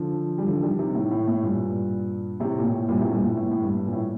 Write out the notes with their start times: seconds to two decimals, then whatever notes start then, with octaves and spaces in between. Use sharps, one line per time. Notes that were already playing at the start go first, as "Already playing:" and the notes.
Already playing: D3 F3
0.38 G3
0.47 D3 F3
0.63 D#3 G3
0.79 C3 D#3
0.95 A2
1.11 A2
1.28 A2
1.43 G2 A#2
2.40 A2 C3
2.59 A#2
2.64 A2
2.89 G2 A#2
3.01 A2 C3
3.13 G2 A#2
3.25 A2
3.37 A2
3.51 A2
3.62 G2
3.85 A#2
3.92 A2